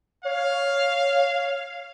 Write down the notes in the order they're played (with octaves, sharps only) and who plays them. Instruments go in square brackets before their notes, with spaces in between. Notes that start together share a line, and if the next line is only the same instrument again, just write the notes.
[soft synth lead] C#5 [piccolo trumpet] F5